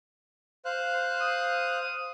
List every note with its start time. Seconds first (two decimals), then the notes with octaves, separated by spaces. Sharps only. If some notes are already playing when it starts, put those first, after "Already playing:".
0.65 C5 F5 F#6
1.21 D#6